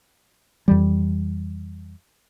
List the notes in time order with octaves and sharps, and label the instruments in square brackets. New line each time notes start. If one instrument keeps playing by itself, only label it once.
[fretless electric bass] F2 E3 G3